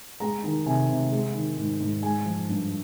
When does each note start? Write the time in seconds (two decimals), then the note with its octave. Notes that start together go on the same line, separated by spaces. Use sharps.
0.20 G#3 A#5
0.43 D#3 A#5
0.66 C3 G#5
0.89 C3
1.11 G#3
1.34 D#3
1.57 G#2
1.80 G#2
2.02 G#3 G#5
2.25 F3
2.49 G2